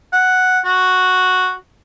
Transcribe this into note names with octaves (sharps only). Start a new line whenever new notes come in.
F#5
F#4